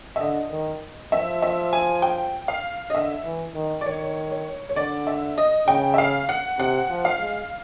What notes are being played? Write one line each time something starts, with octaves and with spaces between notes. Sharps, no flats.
E5
D3 D#5
D#3
F3 E5
E5
G#5
G5
F5
D#5
D3 E5
E3
D#3
D5
D#3 C#5
C#5
C#5
D3 D5
E5
D#5
C#3 G5
E5
F5
F#5
C3 F#5
F3
F5
G#3